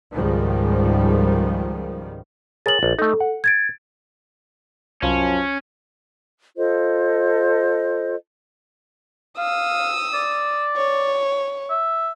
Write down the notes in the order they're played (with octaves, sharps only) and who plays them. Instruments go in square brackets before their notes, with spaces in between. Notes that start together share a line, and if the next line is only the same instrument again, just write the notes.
[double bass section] C#2 G#2 D#3 F3 G3
[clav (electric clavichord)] G#4 A#4 C#5 [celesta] A6 F#7
[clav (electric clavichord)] A#1
[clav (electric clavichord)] A3 D#4 [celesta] A4
[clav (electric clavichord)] F#5
[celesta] G#6 A6 D7
[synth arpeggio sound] C2 F5 B5 [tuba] F#2 [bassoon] F3 [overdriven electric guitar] C#4
[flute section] F4 A4 C5 D#5
[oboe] F5 [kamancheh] D#6 E6
[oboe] D5
[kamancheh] C#5
[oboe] E5